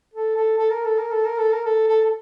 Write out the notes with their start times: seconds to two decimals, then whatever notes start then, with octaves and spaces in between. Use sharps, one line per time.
0.14 A4
0.36 A4
0.58 A4
0.70 A#4
0.84 A4
0.98 A#4
1.11 A4
1.25 A#4
1.38 A4
1.52 A#4
1.65 A4
1.87 A4
2.02 A4